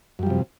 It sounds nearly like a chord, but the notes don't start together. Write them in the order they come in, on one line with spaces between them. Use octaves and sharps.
F#2 G3 F3 C3